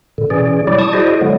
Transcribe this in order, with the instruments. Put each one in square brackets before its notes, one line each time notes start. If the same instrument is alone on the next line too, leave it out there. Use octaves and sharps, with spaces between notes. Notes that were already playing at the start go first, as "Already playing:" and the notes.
[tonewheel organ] A#2 D3
B2 E3 C#4 G#4 D5
F#3 G3 E4 G4 D5
A5 C#6 D#6
E4 F#4 G#4 C5 D5 D#5
D3 F#3 G#3 B3